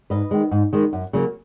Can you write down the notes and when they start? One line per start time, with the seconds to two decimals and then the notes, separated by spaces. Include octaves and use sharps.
0.10 G#2 B4 D#5
0.31 D#3 G#3
0.51 G#2
0.73 D#3 G#3
0.93 F#2
1.13 C#3 F#3 A#3